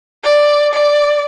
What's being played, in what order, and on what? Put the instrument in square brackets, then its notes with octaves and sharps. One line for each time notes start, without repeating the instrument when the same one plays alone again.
[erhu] D5
D5